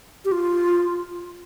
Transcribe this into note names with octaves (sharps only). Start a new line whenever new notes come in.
G4
F4